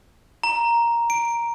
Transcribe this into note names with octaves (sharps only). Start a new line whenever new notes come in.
A#5
D7